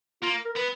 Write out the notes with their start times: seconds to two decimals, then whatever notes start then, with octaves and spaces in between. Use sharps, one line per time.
0.22 A#3 F4
0.45 A#4
0.56 B3 B4